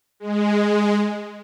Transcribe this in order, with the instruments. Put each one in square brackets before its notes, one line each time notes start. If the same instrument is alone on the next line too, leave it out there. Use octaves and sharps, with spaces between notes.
[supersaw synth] G#3